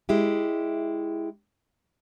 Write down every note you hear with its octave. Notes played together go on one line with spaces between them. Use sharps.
G#3 E4 G4